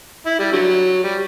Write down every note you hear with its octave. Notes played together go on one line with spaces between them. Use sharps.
E4
G3
D3 F#3
G3